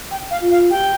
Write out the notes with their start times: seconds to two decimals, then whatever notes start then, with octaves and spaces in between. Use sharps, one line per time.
0.11 G5
0.31 F5
0.41 F4
0.51 F5
0.71 G4 G5